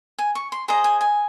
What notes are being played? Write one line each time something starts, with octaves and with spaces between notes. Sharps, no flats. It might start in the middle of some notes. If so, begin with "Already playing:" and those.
G#5
C#6
C6
G#4 C5 D#5 A#5
G#5
G#5